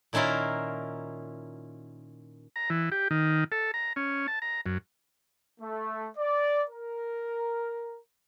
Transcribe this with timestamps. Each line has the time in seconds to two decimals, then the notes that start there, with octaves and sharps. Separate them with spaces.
0.13 A#2 D#3 C#4 E4 F4 A#4
2.56 A#5
2.70 E3
2.92 G4
3.11 D#3
3.52 A4
3.74 A#5
3.96 C#4
4.28 A5
4.42 A#5
4.66 F#2
5.61 A3
6.17 D5
6.70 A#4